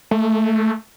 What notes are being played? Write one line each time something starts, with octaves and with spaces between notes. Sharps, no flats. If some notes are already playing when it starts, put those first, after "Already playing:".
A3